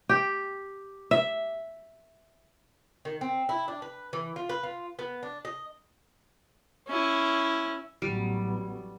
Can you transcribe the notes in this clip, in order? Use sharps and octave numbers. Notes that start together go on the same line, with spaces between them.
G4
E5
D#3
C4
E4
D4
B4
E3
F4
B4
F4
B3
D4
D#5
C#4 E4
A1 F#3 G3 B3